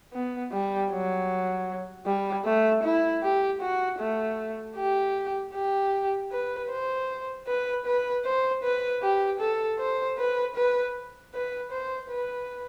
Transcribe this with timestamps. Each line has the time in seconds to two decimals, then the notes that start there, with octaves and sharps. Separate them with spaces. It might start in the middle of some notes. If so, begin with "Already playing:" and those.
0.13 B3
0.52 G3
0.91 F#3
2.06 G3
2.45 A3
2.84 E4
3.23 G4
3.61 F#4
3.99 A3
4.76 G4
5.54 G4
6.31 B4
6.70 C5
7.47 B4
7.85 B4
8.25 C5
8.63 B4
9.02 G4
9.40 A4
9.79 C5
10.18 B4
10.55 B4
11.34 B4
11.72 C5
12.10 B4